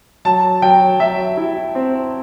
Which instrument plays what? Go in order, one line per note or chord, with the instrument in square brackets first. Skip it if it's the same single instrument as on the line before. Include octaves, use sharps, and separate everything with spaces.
[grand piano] F#3 A5
F#3 G5
F#3 E5
E4
C4